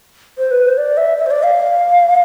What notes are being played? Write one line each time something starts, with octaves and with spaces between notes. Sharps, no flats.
C5
B4
C5
D5
E5
E5
C5
D5
F5